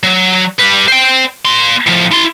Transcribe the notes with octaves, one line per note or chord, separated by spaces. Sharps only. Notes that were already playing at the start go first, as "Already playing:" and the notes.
F#3
G3 B4
C5 G5
A#3 C6
A2 F3
E4 C6